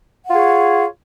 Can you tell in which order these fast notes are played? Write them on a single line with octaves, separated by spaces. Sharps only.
F#5 F4 G#4 C#5